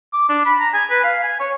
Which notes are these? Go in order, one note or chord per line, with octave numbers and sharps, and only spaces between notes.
D6
D4
B5
A#5
G#5
B4
F5
G#5
C#5